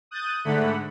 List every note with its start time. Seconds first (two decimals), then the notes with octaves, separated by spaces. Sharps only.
0.11 D#6 F#6 G6 A6 D#7
0.45 G#2 D3 A3 F#5 B5